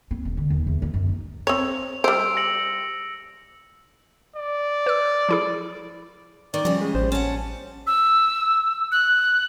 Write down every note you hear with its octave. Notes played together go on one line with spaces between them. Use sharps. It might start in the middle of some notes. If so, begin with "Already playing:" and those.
C4
E1
D3
D#2
E2
D#3
F#2
D#4
C4 C#5 F7
G3 C5 E6 D7
A#6 C#7 F#7
D5
B4 E6
F3 E4 G#4
D#3 D5
C#3 F3 G3
G#3
A1 C5
C#4 F#5 A5
E6
F#6